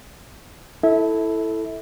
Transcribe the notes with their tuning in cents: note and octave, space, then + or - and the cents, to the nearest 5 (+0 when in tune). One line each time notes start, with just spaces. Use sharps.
E4 +0 A4 +0 E5 -30